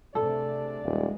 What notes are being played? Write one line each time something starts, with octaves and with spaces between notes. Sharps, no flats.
C3 A3 D4 G#4 A4 D5
D#1 F2 G#3